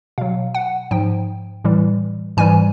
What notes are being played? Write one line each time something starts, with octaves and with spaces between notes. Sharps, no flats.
B2 F#3 F5
F#5
G#2 F3 G5
A2 E3 G3
G#2 E3 G3 G#5